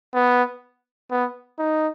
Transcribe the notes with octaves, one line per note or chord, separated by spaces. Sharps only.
B3
B3
D#4